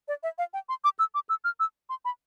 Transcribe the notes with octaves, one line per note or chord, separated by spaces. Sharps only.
D5
E5
F5
G5
C6
D6
E6
D6
E6
F6
E6
C6
B5